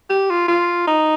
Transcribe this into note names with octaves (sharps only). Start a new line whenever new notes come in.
G4
F4
F4
D#4